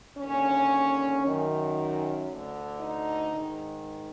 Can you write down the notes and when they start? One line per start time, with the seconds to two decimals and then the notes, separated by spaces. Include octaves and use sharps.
0.18 D#2 D3 C#4
1.22 F#2 D#3
2.27 D2 D3
2.80 D#4
3.31 G#2 D#3